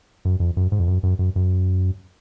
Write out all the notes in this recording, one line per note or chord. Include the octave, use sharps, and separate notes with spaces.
F#2
F2
F#2
G#2
F2
F#2
F#2
F#2
F#2